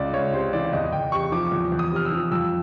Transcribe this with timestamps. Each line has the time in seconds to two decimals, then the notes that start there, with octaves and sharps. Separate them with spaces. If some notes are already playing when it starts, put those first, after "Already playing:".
Already playing: C#2 D5
0.13 C#2 C#5
0.33 C3 C5
0.53 E3 D5
0.73 E2 D#5
0.92 E2 G5
1.12 C3 C#6
1.32 F3 D6
1.52 E2
1.72 E2
1.79 D#6
1.92 C3 F6
2.05 E6
2.12 F3
2.32 F2 E6